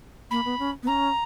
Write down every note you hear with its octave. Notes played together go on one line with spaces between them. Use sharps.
A#3 B5
B3
C#4
B3
C#4 A#5